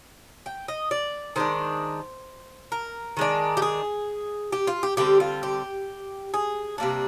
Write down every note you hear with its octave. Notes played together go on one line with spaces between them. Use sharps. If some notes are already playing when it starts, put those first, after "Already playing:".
G5
D#5
D5
D#3 G#3 D4 C5
A#4
D#3 G#3 D4
G4
G#4
G4
F4
G4
D3 G3 C4 G4
F4
G4
G#4
C3 G3 A#3 D4